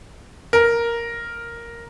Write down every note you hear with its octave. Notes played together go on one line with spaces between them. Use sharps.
A#4